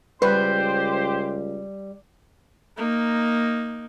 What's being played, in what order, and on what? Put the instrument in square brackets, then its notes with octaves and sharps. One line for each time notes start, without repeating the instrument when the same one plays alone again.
[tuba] C#2 [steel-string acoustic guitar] G3 [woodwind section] G4 C5 [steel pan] B4
[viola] A#3 D#4